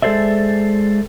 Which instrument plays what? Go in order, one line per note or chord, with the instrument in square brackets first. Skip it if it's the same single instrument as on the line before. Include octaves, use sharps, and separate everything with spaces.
[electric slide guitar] G#3 G#4 A4 C5 D5 E5